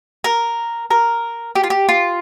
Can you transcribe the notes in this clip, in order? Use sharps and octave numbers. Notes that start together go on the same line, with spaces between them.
A#4
A#4
G4
F4
G4
F4